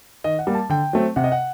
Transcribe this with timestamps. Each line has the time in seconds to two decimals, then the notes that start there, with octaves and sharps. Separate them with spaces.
0.24 D#3 D#5
0.39 F#5
0.47 G3 A#3
0.55 A5
0.69 D3 G5
0.93 F#3 A3 C4
1.16 C3 F#5
1.24 D#5
1.32 F#5